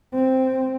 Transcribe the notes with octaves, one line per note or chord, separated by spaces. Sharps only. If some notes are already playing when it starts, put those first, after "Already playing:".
C4